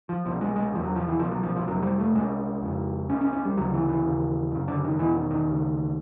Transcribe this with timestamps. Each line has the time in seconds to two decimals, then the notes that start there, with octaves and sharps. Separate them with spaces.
0.09 F3
0.25 C2 B2 F3
0.41 G#3
0.56 G#3
0.72 E2 C3 F3
0.84 F#3
0.95 F3
1.08 E3
1.20 C2 B2 F3
1.31 F#3
1.43 F3
1.56 F3
1.67 F2 C3 F#3
1.83 G3
1.99 A3
2.15 C2 C3 G#3
2.62 F2 C#3
3.09 C2 C3 C#4
3.21 C#4
3.33 C#4
3.45 G3
3.57 D2 C#3 F#3
3.74 E3
3.89 E3
4.04 D#2 C#3
4.52 F#2 C#3
4.68 D3
4.84 D#3
4.99 E2 B2 E3
5.15 D#3
5.31 D#3
5.47 D2 C#3